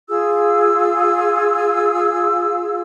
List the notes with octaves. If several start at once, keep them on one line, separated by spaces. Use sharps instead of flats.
F4 G#4 E6